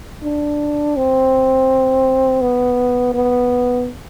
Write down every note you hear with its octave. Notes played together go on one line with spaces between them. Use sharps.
D4
C4
B3
B3